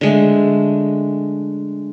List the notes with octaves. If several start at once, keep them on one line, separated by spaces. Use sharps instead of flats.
D3 G#3 A3